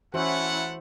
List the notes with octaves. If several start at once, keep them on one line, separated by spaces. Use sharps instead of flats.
E3 A3 C#4 E4 F#4 C5 E5 F#5